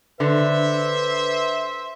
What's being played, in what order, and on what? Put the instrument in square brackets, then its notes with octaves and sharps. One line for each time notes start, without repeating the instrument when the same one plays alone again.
[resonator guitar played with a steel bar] D3 [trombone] B4 [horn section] C5 E5